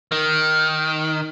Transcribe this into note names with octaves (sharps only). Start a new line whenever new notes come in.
D#3